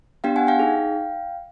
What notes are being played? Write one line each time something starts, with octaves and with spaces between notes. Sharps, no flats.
B3 D4 G4 F5 G5
F#5 G#5
F5 G5
D#4 G#4